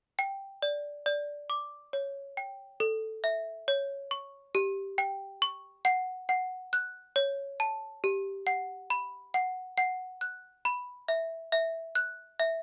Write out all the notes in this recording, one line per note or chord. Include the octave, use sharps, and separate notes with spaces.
G5
D5
D5
D6
C#5
G5
A4
E5
C#5
C#6
G4
G5
C#6
F#5
F#5
F#6
C#5
A5
G4
F#5
B5
F#5
F#5
F#6
B5
E5
E5
F#6
E5